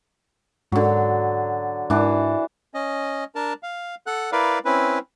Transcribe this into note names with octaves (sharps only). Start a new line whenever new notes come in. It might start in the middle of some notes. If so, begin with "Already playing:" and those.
G#2 D3 F#3
G#2 E3 D4
C#4 D#5
D4 A#4 A5
F5
A4 F#5 F#6
E4 A#4 B4 D5 F5
C4 C#4 E4 B4